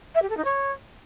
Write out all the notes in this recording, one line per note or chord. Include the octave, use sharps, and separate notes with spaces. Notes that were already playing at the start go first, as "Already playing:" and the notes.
E5
G4
A4
D#4
C#5